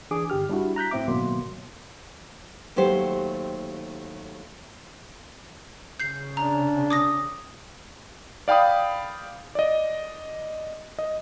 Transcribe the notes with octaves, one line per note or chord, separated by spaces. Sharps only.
E3 D4 G#4 D6
G1 G4 F6
G3 D4 E4 F#4
A#5 F#6 G6 B6
A2 C4 E5 D6
G#1 B2 F#3 A#3 C6
D#2 F#3 A3 G4 C5
C#3 G6 C7
D4 A#5
D6 D#6 A#6
D5 F5 G5 B5 D#6
D5 D#5
D#5